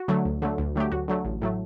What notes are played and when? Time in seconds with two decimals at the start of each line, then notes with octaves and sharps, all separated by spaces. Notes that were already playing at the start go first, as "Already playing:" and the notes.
Already playing: F#4
0.08 D3 F#3 A3
0.25 D2
0.42 D3 F#3 A3
0.58 D2
0.76 D3 F#3 A3 G4
0.92 D2 F#4
1.08 D3 F#3 A3
1.25 A1
1.42 A2 F#3 A3